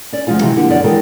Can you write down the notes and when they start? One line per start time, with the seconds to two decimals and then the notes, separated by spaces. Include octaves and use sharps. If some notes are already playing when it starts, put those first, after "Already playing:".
0.12 C#4 D5
0.27 D2 F3 G#3 C#4 F4 G#5
0.41 C3 D#3 E3 F#3 G#3
0.56 D3 F3 A#3 G4
0.69 F#2 D3 B3 D5
0.84 D#3 E3 G#3 G4 A4 A#4